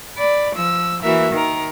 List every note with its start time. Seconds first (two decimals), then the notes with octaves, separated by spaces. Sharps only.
0.17 D5 B5
0.54 F3 E6
1.02 E3 A#3 F#4 A#4 E5
1.34 D#3 A#4